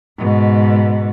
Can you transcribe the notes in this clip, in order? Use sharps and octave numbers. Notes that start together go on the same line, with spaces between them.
G#2 B2